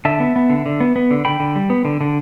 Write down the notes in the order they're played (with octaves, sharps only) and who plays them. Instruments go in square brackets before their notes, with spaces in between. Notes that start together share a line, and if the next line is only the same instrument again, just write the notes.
[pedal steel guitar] D3 E5 A5
B3
B3
D3
D3
B3
B3
D3
D3 G5 B5
D3
G3
B3
D3
D3